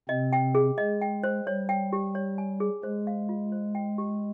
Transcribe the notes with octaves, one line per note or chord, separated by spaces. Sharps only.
C3 C4 D#5
G5
G#4
G#3 D#5
G5
C5
G3 C#5
G5
G4
C#5
G#5
G#4
G#3 C5
F5
F4
C5
G5
G4